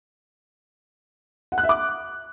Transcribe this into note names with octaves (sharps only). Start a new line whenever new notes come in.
F#5
F#6
E5
D6